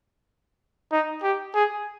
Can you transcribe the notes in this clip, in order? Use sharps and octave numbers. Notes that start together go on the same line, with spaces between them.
D#4
G4
G#4